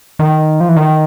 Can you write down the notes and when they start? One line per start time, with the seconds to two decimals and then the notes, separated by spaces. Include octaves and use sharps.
0.19 D#3
0.60 F3
0.69 E3
0.76 D#3